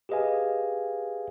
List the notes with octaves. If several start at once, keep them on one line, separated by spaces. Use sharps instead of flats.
G4 G#4 B4 D#5 F5 G#5